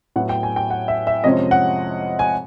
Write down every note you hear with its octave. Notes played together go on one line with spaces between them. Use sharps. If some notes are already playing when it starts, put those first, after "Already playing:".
A2 F#3 B3 F#5
G5
G#5
G5
F#5
E5
E5
F2 C3 F3 G#3 C#4 D#5
F#5
G#5